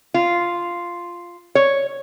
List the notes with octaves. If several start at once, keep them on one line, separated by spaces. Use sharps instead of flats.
F4
C#5